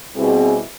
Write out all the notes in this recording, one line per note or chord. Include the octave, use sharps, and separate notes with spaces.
B2 G3 C4 E4 G#4